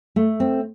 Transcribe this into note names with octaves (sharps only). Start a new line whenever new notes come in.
A3
C4